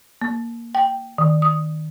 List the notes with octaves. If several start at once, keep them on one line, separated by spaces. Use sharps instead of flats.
A#3
G5
D#3
D#6